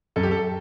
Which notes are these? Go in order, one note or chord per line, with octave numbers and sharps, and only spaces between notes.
F#2 A4
G4
A4